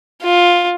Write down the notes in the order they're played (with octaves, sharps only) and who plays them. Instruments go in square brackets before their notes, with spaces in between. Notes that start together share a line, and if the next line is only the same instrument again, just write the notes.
[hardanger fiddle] F4